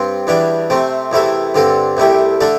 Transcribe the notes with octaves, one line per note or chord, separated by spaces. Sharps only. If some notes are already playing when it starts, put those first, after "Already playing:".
Already playing: G2 C4
E2 E3 G3 D4
C3 A3 C4
E2 C3 A3 E4 A4
G2 D3 C4 A4
C2 C3 A3 E4 G4
D3 A3 D4 A4